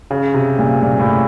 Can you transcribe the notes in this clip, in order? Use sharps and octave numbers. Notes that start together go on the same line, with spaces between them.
C#3
C3
A#2
A#2
A2